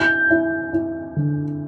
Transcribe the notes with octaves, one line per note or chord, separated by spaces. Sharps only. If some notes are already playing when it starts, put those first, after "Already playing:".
Already playing: E4 G6
E4
E4
D3